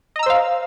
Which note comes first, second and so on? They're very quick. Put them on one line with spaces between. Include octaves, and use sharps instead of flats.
D#5 A#5 E6 C5 F5